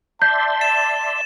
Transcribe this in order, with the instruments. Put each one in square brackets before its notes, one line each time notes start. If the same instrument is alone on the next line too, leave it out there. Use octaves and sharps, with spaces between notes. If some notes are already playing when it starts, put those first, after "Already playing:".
[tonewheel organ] D5 E5 C6 [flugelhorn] A5 [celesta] G6
[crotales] A6 E7